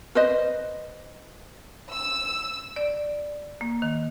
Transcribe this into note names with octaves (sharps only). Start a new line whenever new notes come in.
B4 C5 D#5
E6
D5
A#3
D#3